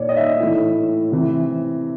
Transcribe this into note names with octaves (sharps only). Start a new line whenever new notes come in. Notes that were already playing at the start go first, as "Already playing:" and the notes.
Already playing: A#2 C#5 D5
D#5
E5
A2 E3
C3 E3